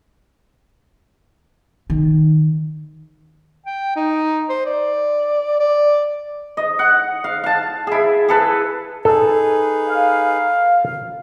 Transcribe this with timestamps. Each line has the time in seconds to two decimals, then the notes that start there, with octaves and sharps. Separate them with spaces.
1.90 D#3
3.66 G5
3.96 D#4
4.49 C5
4.66 D5
5.60 D5
6.57 D#5
6.79 F#5
7.24 F5
7.44 F5 A5
7.87 E4 G#4
8.28 G#4 A4 B4
9.05 D#4 G#4 A4 B4
9.89 F5